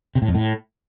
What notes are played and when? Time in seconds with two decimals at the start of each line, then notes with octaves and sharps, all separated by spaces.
0.15 C3
0.22 A2
0.28 F2
0.35 A2